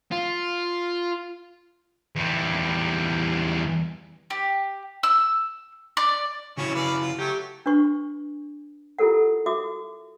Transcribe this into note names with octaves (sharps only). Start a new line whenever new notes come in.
F4
E2 G3
G4
E6
D5
C#3 C#4 E4 F#4
B4 D5 F5
F4
F#3 A3 G4
D4 B4 C#6
E4 F4 G4 A4 A#4 F#5
F#4 E5 D6 D#6